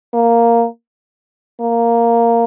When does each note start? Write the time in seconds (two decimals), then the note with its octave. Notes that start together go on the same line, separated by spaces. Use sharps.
0.14 A#3
1.61 A#3